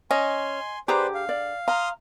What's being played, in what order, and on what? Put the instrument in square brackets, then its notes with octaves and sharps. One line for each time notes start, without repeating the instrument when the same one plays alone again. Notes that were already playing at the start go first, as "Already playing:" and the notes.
[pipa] C#4 [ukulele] D#5 [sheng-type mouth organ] G#5 C6
[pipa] D3 G#4 A#5 [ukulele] G4 [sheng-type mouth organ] B4 C5 D5
[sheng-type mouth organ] F5
[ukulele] D5
[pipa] F5 [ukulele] A#5 [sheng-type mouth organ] C6 D#6 F6